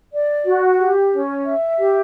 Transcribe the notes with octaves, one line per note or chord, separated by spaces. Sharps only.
D5
F#4
G4
C#4
E5
G4